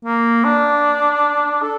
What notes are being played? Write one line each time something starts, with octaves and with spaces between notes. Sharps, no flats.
A#3
D4
A4